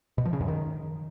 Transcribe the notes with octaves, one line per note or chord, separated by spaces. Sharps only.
B2
F3
C#3
F#2
D#3